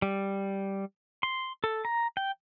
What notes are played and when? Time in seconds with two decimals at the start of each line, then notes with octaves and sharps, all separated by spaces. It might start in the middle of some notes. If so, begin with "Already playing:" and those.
0.02 G3
1.23 C6
1.64 A4
1.85 A#5
2.17 G5